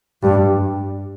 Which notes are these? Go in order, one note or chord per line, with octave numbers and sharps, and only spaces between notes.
G2